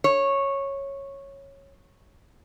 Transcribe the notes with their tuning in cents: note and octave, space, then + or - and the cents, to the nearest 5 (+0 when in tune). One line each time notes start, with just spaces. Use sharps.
C#5 -10